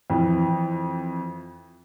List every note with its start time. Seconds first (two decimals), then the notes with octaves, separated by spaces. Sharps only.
0.10 F2 E3